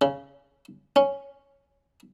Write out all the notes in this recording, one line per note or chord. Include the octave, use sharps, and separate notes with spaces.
C#3
C#4